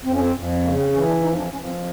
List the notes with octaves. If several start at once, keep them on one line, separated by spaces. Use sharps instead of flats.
F2 C4
C#4
C4
F2
C#3 A#3
C4
E3 C#4
D4
F2 D#4
D#4
D4
F2 C#4
C4